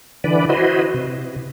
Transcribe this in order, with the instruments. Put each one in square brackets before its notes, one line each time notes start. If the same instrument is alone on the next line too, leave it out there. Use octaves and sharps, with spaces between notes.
[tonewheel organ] D3 E3 B4 D5
E4 F#4 B4 C5 D#5
C3